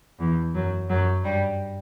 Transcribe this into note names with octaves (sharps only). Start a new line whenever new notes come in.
E2 E3
F#2 F#3
F#2 F#3
G2 G3